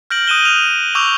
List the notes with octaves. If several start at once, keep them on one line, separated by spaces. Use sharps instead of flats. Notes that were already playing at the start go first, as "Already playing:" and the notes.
F6 G6 A#6 D7 F#7
D#6 F#6 D#7 E7 G7
D#6 F6 F7
C#6 D6 E6 G6 F7